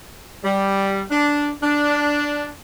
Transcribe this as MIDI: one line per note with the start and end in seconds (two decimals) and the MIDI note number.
0.45 1.02 55
1.11 1.51 62
1.62 2.50 62